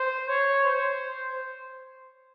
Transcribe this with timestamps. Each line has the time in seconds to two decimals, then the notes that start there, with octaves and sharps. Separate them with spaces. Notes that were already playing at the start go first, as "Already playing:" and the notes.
Already playing: C5
0.29 C#5
0.65 C5